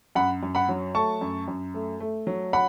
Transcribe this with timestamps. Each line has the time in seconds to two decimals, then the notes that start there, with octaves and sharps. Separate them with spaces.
0.15 F#2 F#5 B5
0.43 F#2
0.55 F#5 B5
0.69 F#3
0.95 A3 A5 C#6
1.21 F#2
1.48 F#2
1.74 A3
2.00 A3
2.27 F#3
2.53 F#5 B5